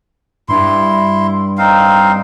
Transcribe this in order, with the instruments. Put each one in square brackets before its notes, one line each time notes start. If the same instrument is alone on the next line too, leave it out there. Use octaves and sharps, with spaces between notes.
[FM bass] G2 [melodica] E4 C6
[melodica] C4 D#4 F5